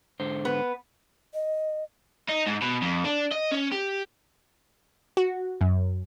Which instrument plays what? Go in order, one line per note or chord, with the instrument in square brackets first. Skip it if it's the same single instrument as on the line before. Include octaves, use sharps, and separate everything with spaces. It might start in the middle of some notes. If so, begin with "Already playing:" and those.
[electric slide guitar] G#2 D3 C5
[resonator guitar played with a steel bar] B3 B4
[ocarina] D#5
[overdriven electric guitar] D#4
G#2
B2
F2
D4
D#5
C#4
G4
[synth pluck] F#4
F#2